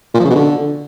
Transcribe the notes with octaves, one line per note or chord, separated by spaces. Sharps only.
A#2
F3
C#3
B2
D3